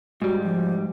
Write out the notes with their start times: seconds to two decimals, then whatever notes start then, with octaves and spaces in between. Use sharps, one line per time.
0.22 G#2 G3 F#4
0.44 F3